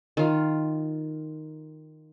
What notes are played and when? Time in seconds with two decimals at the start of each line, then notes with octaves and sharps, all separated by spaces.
0.17 D#3 F4